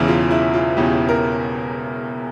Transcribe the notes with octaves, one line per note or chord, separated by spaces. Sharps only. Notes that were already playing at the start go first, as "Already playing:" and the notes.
Already playing: E1 E2 C#3 E3
F4
E4
F4
E1 E2 C#3 E3 G4
A#4